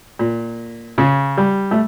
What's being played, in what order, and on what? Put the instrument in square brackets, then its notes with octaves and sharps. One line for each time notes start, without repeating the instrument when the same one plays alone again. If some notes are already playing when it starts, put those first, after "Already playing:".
[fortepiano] A#2
C#3
G3
A3